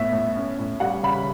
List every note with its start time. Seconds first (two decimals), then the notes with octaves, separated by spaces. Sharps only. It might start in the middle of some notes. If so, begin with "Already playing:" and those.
Already playing: A2 B3 E5
0.13 A2
0.36 C#4
0.59 A2
0.80 G3 F#5
1.03 C#3 B5